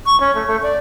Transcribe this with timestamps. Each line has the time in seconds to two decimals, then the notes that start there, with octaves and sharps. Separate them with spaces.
0.06 C#6
0.20 C#4
0.35 A3
0.47 A3
0.63 D5